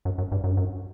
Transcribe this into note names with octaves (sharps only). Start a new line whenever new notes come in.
F#2
F#2
G2
F#2
G2
F#2